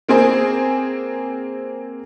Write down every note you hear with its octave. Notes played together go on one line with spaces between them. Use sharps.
A#3 C4 G#4 C5